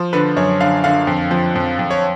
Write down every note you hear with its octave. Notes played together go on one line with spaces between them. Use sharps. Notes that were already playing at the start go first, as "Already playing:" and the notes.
Already playing: F3
D3 B4
F#2 C#5
D3 F5
D3 F5
F2
F3
F2
F2
C#5